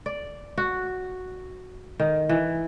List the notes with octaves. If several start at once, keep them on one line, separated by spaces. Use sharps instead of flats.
D5
F#4
D#3
E3